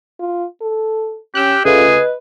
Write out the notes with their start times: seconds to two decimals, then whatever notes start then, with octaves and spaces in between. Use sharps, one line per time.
0.20 F4
0.61 A4
1.35 C#4 G4 G5 E6 F#6
1.65 C#3 A3 F4 G#4 B4 D#5